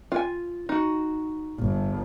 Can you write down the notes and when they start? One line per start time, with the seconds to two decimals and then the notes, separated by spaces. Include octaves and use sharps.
0.12 F4 G#5
0.69 D#4 F#4
1.59 G1